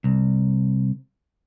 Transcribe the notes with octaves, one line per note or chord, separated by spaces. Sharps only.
C2